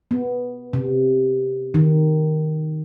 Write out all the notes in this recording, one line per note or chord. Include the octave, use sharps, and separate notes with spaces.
B3
C3
D#3